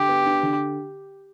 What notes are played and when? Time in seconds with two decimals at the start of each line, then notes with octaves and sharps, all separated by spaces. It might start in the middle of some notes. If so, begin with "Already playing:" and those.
Already playing: D3 G4
0.09 B3
0.26 D4
0.43 D3